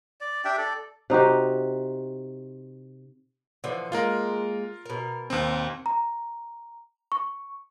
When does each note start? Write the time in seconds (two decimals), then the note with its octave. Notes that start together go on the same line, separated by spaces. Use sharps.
0.21 D5
0.45 D4 G4 E5 G5
0.57 A4 D5
1.10 C3 D#4 F#4 G4
3.64 D3 E3 F3
3.92 G#3 A#3 F4 A#4
4.86 B2 A#4
5.30 D#2 C4
5.86 A#5
7.12 C#6